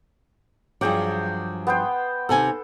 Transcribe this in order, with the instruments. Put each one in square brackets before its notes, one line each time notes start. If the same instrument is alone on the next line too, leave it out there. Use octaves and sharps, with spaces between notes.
[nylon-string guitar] G2 F3 F#3 [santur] G#4 G5 D6
[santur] B3 C5 G5
[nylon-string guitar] D#2 C3 G#5 [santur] A4